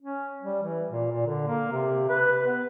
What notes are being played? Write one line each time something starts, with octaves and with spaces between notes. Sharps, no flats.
C#4
G3
E3
A#2
A#2
D3
A#3
C3
B4
B3